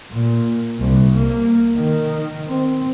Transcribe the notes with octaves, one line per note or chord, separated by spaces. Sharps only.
A#2
C2
A#3
D#3
C4